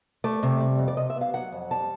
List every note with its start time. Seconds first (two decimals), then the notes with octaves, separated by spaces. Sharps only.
0.24 A3 D5
0.43 C3
0.60 G3
0.78 F2
0.88 D5
0.97 C3 D#5
1.10 E5
1.16 B3 F5
1.34 F#3 F#5
1.52 F2
1.71 G3 A5